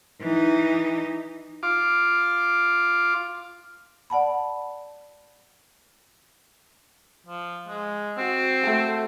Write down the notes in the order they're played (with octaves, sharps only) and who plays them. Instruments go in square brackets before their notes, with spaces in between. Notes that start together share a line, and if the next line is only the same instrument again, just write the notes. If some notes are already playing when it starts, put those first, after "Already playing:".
[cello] E3 D#4
[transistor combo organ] F4 D6
[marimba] D5 F#5 A5 B5
[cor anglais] F3
G#3
[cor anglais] C4 [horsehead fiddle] F#4
[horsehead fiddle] A3 F#4